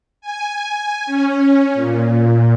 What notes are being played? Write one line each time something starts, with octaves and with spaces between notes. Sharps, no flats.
G#5
C#4
A#2